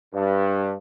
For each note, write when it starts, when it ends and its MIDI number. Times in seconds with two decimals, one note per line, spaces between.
0.13 0.72 43